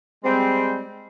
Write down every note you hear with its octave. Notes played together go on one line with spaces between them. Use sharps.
G3 G#3 C4